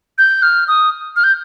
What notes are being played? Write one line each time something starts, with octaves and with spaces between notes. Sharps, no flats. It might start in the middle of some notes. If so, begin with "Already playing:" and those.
G6
F6
D#6
F6
G6